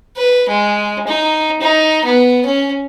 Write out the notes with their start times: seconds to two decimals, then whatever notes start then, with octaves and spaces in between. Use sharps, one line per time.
0.17 B4
0.48 G#3
1.07 D#4
1.61 D#4
2.05 B3
2.45 C#4